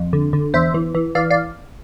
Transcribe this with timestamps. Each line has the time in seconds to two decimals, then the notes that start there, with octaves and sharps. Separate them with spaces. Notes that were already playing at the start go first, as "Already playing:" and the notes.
Already playing: F2
0.13 D3
0.33 D3
0.54 E2 C5 E5
0.74 E3
0.95 E3
1.15 E3 D5 F5
1.30 D5 F5